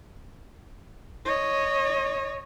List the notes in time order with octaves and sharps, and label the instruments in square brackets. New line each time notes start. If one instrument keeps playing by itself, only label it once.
[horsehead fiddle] C#5 D#5